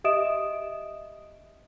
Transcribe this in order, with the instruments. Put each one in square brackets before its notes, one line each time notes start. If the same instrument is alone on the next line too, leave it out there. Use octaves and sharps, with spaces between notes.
[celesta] G4 D#5 E5 D#6 D7 E7